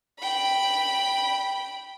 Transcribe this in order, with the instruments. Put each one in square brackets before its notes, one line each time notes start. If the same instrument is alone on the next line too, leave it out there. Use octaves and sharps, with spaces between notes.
[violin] G5 B5